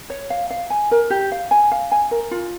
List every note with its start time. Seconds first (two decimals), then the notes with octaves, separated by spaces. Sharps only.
0.10 C#5
0.30 F5
0.50 F5
0.70 G#5
0.91 A#4
1.10 G4
1.32 F5
1.51 G#5
1.72 F5
1.92 G#5
2.11 A#4
2.31 F4